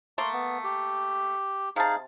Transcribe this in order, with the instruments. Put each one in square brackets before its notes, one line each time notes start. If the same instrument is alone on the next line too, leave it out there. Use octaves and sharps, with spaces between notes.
[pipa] A3 A#3 [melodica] C6
[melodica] B3
G4
[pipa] C3 A5 [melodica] D#4 G#4 F5